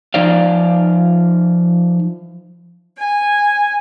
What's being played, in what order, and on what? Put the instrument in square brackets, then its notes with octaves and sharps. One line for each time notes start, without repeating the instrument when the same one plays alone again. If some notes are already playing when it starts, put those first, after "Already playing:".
[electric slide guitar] F3 D#4 C5 D5 F5
[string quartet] G#5